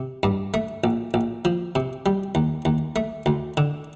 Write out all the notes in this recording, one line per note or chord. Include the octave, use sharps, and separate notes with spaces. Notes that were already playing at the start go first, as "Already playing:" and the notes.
Already playing: C3
G2
A3
A#1
A#1
F3
C3
G3
D#2
D#2
A3
D2
D3